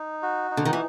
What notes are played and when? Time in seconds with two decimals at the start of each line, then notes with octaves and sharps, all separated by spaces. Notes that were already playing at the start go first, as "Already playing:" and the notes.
Already playing: D#4
0.22 F#4
0.51 D#4
0.57 D3
0.65 D#3
0.73 E3